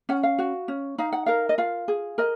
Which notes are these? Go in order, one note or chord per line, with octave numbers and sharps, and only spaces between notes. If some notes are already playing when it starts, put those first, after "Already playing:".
C#4 F#5
F5
F#4
C#4
D#4 F5
F#5
A#4 F5
D#5
F4 F5
G#4
A#4 D#5